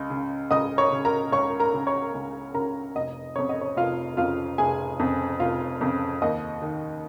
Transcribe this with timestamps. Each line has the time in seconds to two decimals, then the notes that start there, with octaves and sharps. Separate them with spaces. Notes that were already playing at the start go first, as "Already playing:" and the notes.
Already playing: C#2 D#5
0.10 C#3
0.51 C#2 D#5 D#6
0.78 C#5 C#6
0.92 C#3
1.05 A#4 A#5
1.32 C#2 C#5 C#6
1.59 A#4 A#5
1.74 C#3
1.87 C#5 C#6
2.15 C#2
2.54 C#3 A#4 A#5
2.95 F1 D#5
3.36 F2 C#3 C#5
3.49 D#5
3.61 C#5
3.76 F1 F4 F5
4.17 F2 C#3 F4 F5
4.58 F1 G#4 G#5
4.99 F2 C#3
5.39 F1 F4 F5
5.81 F2 C#3
6.22 D#2 D#5
6.62 D#3